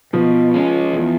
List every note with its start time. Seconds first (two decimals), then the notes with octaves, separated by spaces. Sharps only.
0.13 B2 F3
0.54 G#3 C#4
0.93 E2